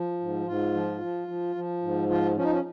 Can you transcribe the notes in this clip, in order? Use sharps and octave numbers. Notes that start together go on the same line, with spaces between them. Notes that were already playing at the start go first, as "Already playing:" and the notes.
Already playing: F3
G#2
G#2 F4
F3
F3
F3
F3
G#2
F3 F4
F3 C#4
D#4
C#4